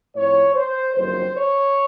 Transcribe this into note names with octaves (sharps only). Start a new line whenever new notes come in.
A2 F3 C4 C#5
C5
F#1 F2 D#3 F#3 C5
C#5